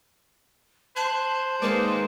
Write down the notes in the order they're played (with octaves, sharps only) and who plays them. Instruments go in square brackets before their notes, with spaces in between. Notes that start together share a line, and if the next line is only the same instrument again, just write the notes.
[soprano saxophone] C5 [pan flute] A5 [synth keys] F#6 G#6
[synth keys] D#3 A#3 D5 [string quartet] G#3 [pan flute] B4